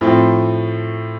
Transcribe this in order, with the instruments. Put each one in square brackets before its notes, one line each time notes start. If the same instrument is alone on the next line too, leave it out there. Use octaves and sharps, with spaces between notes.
[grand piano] A2 F3 A3 C4